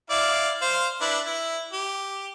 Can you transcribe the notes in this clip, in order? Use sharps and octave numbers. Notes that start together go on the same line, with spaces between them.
E4 D5 F5
C5 F5
D4 E4 B4
E4
G4